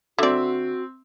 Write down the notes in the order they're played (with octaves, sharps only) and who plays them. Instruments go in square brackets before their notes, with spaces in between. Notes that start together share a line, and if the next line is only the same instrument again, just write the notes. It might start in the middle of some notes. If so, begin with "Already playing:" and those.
[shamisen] D3 D5 [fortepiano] C4 E5 [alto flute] F#4